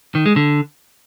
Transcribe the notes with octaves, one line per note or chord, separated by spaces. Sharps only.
D#3
G#3
D3